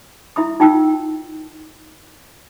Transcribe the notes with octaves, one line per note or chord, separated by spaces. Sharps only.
E4 E5 B5 D#6
D#4 F4 F#5 G5 E6